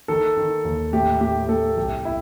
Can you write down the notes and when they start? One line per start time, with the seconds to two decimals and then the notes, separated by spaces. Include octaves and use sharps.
0.08 D#3 A4
0.37 D#3
0.65 D#2
0.93 A2 G4
1.21 A2 G4
1.43 G4
1.49 A2 A4
1.77 C2 G4
2.05 E4